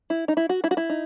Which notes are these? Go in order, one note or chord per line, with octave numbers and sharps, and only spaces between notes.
E4
D#4
E4
F#4
E4
F#4
E4
D#4